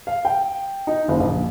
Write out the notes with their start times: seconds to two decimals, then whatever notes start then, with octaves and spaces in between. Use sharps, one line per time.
0.07 F5
0.25 G5
0.87 D#4
1.08 F#1
1.20 A#1